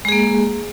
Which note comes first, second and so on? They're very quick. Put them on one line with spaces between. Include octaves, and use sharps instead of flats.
G#3 G#4 A#3